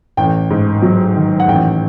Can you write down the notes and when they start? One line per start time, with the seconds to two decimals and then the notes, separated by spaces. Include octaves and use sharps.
0.17 A1 G5
0.50 G#2
0.82 F#3
1.15 D#3
1.40 F#5
1.48 A1 G5